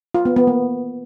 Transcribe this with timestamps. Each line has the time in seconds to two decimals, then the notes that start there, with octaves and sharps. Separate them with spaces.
0.14 F4
0.25 B3
0.36 B3
0.47 A#3